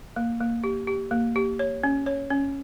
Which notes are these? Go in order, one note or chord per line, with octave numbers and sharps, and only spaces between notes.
A#3
A#3
G4
G4
A#3
G4
C#5
C#4
C#5
C#4